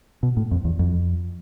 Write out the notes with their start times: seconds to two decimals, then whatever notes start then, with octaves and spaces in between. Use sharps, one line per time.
0.23 B2
0.37 A2
0.51 F2
0.65 E2
0.79 F2